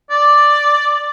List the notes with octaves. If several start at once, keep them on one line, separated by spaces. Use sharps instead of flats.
D5